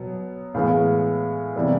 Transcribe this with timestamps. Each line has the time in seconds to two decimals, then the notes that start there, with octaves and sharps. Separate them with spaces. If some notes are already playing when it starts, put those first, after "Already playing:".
Already playing: B2 F#3 B3
0.54 A2 E3 G#3 B3 F5
1.56 C3 E3 G3 B3